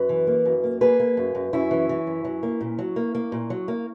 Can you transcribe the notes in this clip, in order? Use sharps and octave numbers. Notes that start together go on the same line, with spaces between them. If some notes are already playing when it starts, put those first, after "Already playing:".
Already playing: F#2 B4
E3
A#3
F#2
A#3
A#3 G#4 B4
A#3
F#2
F#2
F#2 C#4 E4
E3
E3
F#2
F#3
A#3
A#2
F#3
A#3
A#3
A#2
F#3
A#3